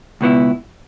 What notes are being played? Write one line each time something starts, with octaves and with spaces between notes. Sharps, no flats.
C#2 B2 B3 E4